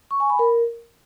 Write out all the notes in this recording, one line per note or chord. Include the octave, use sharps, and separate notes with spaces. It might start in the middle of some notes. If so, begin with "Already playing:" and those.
C#6
G#5
B5
A#4